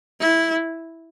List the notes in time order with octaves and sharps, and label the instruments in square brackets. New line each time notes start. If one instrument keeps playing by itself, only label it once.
[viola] E4